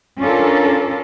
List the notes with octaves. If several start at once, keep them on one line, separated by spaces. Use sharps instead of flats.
C#4 D4 F4 A4 A#4